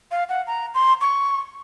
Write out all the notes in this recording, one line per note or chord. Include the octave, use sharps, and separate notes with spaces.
F5
F#5
A#5
C6
C#6